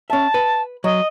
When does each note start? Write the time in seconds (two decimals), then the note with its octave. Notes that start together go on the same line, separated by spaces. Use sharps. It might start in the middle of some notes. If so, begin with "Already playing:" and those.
0.10 C#4 E5 A5
0.34 B4
0.84 F#3 D#5